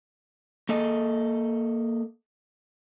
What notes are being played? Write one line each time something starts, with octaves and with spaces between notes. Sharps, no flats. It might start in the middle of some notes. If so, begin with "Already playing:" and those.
A#3 A4 D#5